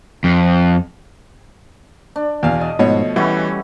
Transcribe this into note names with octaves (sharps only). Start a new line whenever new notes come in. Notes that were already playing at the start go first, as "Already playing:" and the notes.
F2
D4
E2 B2 F5
D#5
G#2 B2 F3 A3 C#5
E3 G3 A3 C#4 E4 F#4 B4